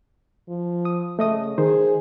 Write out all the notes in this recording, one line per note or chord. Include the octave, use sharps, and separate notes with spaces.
F3
D#6
C#3 A3 D#5 D#6
D#3 G#4 C5